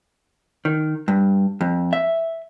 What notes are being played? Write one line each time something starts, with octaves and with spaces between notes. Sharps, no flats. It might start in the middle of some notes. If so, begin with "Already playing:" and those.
D#3
G2
F2
E5